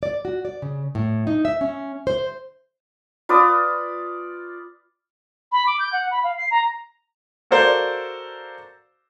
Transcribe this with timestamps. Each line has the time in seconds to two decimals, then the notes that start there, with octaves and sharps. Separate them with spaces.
0.03 D5
0.25 F#4
0.45 D5
0.62 C#3
0.95 A2
1.27 D#4
1.45 E5
1.61 C#4
2.07 C5
3.29 F4 B4 D5 D#6
5.52 B5
5.66 D6
5.79 G6
5.93 F#5
6.11 B5
6.24 F5
6.37 C7
6.51 A#5
7.51 F#4 A4 A#4 C5 D5 F5